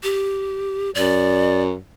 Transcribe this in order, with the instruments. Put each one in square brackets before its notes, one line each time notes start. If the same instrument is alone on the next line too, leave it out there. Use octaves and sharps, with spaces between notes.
[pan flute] G4
[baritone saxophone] F#2 [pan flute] D5